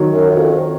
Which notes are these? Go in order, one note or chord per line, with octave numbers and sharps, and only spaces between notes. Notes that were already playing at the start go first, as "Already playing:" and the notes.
Already playing: D#3 F#3
F#2
F#2
F2